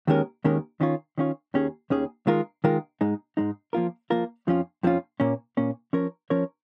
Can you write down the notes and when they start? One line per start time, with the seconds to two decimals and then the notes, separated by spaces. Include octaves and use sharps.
0.07 D#2 D#3 G#3 C#4 A#4
0.44 D#2 D#3 G#3 C#4 A#4
0.81 D#3 C#4 F4 C#5
1.18 D#3 C#4 F4 C#5
1.54 D#2 D#3 C#4 G#4
1.90 D#2 D#3 C#4 G#4
2.27 D#3 G#3 F4 A#4
2.64 D#3 G#3 F4 A#4
3.01 G#2 G#3 D#4
3.37 G#2 G#3 D#4
3.73 F3 A#3 F4 A#4
4.10 F3 A#3 F4 A#4
4.47 F2 F3 C#4 F4
4.83 F2 F3 C#4 F4
5.20 A#2 A#3 C#4
5.57 A#2 A#3 C#4
5.93 F3 C#4 A#4 C#5
6.30 F3 C#4 A#4 C#5